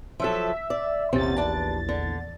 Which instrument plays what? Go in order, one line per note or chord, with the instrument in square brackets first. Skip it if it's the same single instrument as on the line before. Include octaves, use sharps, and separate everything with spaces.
[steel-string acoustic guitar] F3 F#3 A4 [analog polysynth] E5
[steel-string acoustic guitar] D5
[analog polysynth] A#1 E2 A6 [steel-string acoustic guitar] C3 C4 C#4
[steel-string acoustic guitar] D#2 D4 A5
D3